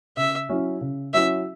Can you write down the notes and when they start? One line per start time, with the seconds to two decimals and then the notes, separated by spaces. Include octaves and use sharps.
0.17 C#3 E5
0.49 F#3 C#4 E4
0.81 C#3
1.14 F#3 C#4 E4 E5